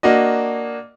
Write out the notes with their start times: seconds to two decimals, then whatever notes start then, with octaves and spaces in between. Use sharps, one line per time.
0.03 A#3 D4 F#4 D#5